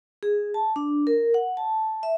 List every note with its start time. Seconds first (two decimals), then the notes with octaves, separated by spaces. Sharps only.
0.23 G#4
0.54 A5
0.76 D4
1.07 A#4
1.34 F#5
1.57 A5
2.03 E5